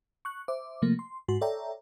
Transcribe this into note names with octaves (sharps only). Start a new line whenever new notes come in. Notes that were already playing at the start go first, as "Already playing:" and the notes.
C#6 F#6
C5 E5 D6
C3 F3 A3 A#3
C6
G#2 F#4 C6
A4 C#5 D5 E5 G5 A#5